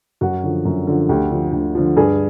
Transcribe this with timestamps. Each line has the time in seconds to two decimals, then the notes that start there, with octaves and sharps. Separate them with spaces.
0.21 F#2 F#4 F#5
0.43 D3 F3
0.65 F#2
0.87 D3 F3
1.09 D2 G4 G5
1.31 D3 F3
1.53 D2
1.75 D3 F3
1.96 G2 G#4 G#5